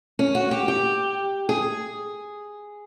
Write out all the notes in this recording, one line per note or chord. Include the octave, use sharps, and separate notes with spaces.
C#4
F#4
G4
G4
G#4